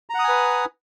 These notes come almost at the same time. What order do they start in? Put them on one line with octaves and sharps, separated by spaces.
A#5 F#5 D#6 G#5 B4